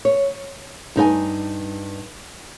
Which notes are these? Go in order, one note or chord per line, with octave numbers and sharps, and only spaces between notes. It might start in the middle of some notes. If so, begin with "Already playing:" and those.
C#5
G2 D#4 B4 G#5